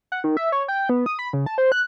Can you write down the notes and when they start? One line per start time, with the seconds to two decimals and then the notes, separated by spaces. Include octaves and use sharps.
0.12 F#5
0.24 D#3
0.37 E5
0.52 C#5
0.68 G5
0.89 B3
1.06 D#6
1.19 B5
1.33 C#3
1.46 A5
1.58 C5
1.72 F#6